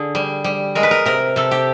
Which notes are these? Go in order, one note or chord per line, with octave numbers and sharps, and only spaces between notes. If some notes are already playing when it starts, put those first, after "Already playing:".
Already playing: D3 G#4
G3
G3
G#3 A#4
B4
A#4
C3 A#4
C3 A4
G4